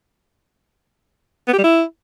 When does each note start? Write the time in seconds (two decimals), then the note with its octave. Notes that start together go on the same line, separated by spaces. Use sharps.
1.48 B3
1.53 G4
1.58 G3
1.64 E4